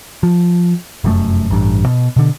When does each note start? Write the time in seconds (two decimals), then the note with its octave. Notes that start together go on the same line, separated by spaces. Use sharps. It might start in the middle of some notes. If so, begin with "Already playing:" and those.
0.23 F3
1.04 F1 F#2 A3
1.50 A1 G2
1.86 B2
2.16 B2 D3